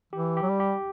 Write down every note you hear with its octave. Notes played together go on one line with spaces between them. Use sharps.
E3 G4
G4
F#3
G3
G4